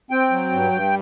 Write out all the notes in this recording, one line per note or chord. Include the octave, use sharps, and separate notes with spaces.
C4 G5
F#3
G2
G2